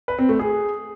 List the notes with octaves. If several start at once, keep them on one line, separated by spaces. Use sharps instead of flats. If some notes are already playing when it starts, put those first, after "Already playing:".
B4
C4
A3
G#4